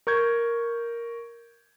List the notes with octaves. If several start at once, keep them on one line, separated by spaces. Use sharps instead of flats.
A#4 C#6 G6 G#6